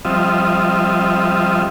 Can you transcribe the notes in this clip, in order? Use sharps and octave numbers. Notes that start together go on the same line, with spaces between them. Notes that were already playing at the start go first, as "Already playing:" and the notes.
F3 G3 C4 F4 D#5 E5